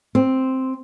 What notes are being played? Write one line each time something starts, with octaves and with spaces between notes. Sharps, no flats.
C4